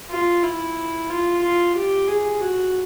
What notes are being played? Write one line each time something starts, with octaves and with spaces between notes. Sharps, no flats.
F4
E4
F4
F4
G4
G#4
F#4